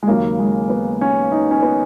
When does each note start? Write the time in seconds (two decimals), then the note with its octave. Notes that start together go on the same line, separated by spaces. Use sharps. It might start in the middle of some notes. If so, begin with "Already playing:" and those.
0.03 G#3
0.08 D#2 C#3 F#3 A#3
0.39 G#3
0.70 B3
1.01 C#4
1.32 D#4
1.51 C#4
1.62 B3